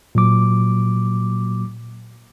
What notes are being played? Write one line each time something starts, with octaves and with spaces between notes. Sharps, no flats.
A#2 F#3 D6